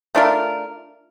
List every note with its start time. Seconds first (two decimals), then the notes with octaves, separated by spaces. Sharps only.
0.15 A3 D4 F4 A#4